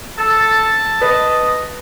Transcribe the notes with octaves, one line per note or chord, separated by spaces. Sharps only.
A4 A5
B4 D#5